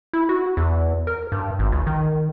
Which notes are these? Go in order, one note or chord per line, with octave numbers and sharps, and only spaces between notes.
E4
F#4
E2
A#4
G2
G#1
C#2
D#3